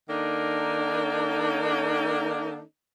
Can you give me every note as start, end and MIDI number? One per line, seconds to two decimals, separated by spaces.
0.09 2.61 51
0.09 2.61 58
0.09 2.61 62
0.09 2.61 63
0.09 2.61 69